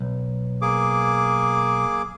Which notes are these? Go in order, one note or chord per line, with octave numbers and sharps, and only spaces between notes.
B1
A#3 G#4 D6